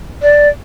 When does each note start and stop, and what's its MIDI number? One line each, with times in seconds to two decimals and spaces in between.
0.22 0.49 74